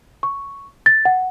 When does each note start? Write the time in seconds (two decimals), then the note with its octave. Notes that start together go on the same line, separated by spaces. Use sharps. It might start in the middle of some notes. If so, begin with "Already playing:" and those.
0.23 C#6
0.86 A6
1.05 F#5